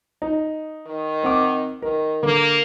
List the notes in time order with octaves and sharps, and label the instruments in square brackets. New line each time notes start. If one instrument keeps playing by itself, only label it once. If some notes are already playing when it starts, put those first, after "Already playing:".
[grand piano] D#4
[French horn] D#3
[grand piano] C4 F#5 D6
[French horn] D#3 [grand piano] A#4
[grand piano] D3 [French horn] A#3